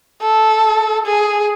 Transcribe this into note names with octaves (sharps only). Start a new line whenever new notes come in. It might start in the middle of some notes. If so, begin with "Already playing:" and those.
A4
G#4